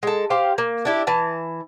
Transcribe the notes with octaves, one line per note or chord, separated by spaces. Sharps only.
G#3 A4
G4 C5 F5
A#3
D4 E4 G4
E3 A5